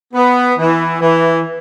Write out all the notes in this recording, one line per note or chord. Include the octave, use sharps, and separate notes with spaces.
B3
E3
E3